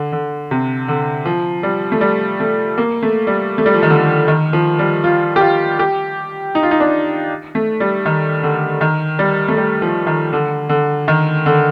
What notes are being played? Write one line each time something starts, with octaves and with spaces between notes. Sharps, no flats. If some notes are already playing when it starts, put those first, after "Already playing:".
Already playing: D3
D3
C3
D3
F3
G3
A3
G3
A3
A#3
A3
G3
A3
G3
F3
D#3
D3
D#3
F3
G3
F4
G4
F4
G4
D#4
F4
D#4
D4
A3
G3
D#3
D3
D#3
G3
A3
G3
F3
D#3
D3
D3
D#3
D3